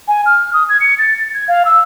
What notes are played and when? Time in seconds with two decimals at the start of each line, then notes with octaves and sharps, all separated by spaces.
0.08 G#5
0.26 F6
0.53 D#6
0.69 G#6
0.80 C#7
0.98 A6
1.17 A6
1.34 G#6
1.48 F5
1.65 E6